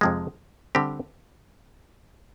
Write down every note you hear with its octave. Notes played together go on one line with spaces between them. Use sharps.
F2 C3 F3 G#3
D3 G3 C4 G4